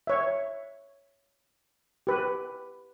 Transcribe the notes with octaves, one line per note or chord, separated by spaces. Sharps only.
C#5 E5
G4 B4